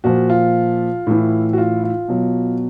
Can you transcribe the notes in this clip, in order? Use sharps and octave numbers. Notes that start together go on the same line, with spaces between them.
A#2 F3 F#4
F4
A2 E3
F#4
F4
F4
B2 F#3